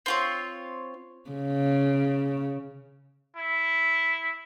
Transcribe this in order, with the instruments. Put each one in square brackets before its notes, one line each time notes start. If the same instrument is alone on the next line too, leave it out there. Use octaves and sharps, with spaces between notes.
[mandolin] C4 F4 C#5
[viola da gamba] C#3
[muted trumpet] E4